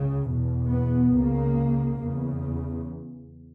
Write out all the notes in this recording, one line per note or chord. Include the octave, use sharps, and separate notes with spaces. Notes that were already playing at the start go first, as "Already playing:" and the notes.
Already playing: C#2 C#3
E2 B2
B3
C#2 C#3 A#3
E2 C#3